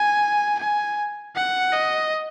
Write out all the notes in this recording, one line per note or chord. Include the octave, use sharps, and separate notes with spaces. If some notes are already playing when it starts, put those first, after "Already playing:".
Already playing: G#5
G#5
F#5
D#5